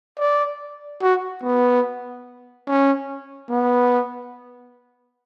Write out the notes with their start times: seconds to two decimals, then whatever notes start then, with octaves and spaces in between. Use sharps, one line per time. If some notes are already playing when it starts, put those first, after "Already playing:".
0.19 D5
1.02 F#4
1.43 B3
2.67 C#4
3.50 B3